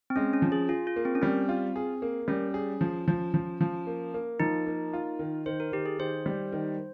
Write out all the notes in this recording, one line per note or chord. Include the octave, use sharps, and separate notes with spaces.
C4
G#3 C#4
C#4
F3
G#4
F4 G#4
F4
A#3
C4
C#4
G3 C4
F4
G#4
A#3
G3 C#4
G#4
F3
F3
F3
F3
A#3
A#3
F3 D#4
A#3
F4
D#3
D#3 C5
A#4
D#3 G4
G#4
D#3 C5
G3
D#3